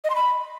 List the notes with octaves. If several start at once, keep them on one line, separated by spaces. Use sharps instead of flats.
D#5
C6
B5